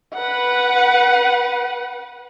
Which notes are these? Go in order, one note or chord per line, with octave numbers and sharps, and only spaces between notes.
B4 F#5